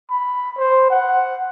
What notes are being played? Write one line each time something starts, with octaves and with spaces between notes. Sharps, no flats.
B5
C5
F#5